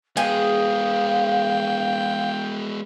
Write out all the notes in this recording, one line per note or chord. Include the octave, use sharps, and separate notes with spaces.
G#3 B3 G#4 F5 G5